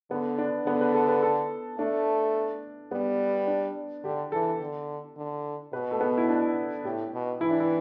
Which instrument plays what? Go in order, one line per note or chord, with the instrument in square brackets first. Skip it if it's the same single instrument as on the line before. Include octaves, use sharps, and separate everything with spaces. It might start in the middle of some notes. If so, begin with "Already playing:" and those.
[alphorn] D3 [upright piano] B3
[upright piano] D4
[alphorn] D3 [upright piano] B3
[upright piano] B4
A4
B4
A4
[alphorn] A3 [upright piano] D4
[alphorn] G3 [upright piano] B3
[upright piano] D4
[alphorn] D3 [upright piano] G4
[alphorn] E3 [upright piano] A4
[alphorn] D3
D3
[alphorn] B2 [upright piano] B4
[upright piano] A3
B3
E4
D4
[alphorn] A2 [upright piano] G4
[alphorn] B2
[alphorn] E3 [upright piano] E4
[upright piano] D4
E4